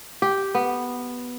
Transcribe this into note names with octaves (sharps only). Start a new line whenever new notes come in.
G4
B3